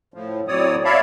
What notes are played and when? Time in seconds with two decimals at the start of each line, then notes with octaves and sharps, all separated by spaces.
0.14 A2 F3
0.48 A2 F#3 C4 C#5 D5 D#6
0.85 C#5 D5 E5 F5 A5 B5